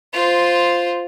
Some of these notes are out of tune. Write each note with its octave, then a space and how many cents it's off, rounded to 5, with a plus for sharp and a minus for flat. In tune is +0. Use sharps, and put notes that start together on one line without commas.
F4 +0 C5 -5